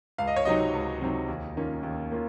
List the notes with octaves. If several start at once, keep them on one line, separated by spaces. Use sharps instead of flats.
C#2 F5
D#5
C#5
C3 F#3 C4 D#4 D#5
C#2
C3 F#3 C4 D#4
D#2
D#3 A#3 C#4 F4
D#2
D#3 A#3 C#4 F4